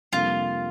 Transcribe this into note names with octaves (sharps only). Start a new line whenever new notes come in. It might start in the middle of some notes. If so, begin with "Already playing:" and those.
F2 C3 G3 A#3 D4 F4